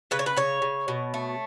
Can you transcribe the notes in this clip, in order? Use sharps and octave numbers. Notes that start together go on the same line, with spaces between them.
C#3 B4
C#5
B4
C#3 C#5
C#3
B2
A3